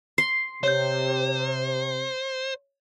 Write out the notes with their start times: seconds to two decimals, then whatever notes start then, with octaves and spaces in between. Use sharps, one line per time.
0.18 C6
0.63 C3 C5 C#5 G6